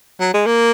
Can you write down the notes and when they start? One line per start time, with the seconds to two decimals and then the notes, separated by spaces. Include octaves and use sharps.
0.20 F#3
0.34 G#3
0.46 A#3